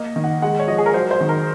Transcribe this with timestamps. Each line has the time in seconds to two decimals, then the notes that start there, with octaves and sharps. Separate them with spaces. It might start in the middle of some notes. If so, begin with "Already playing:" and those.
Already playing: A#3 D#5
0.16 D#3
0.24 F#5
0.42 G#3 F#5
0.59 C#5
0.67 F3 D#5
0.78 G#4
0.86 A#4
0.94 F#3 C5
1.11 C5
1.21 D#3
1.29 A#4